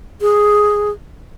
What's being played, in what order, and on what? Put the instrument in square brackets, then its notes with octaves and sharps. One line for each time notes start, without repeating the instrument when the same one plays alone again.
[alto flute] G#4